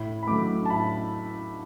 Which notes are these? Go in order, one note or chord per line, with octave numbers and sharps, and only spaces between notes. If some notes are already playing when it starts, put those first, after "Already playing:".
Already playing: A2 B5
B5
F#3 A3 D6
A5
A2 B5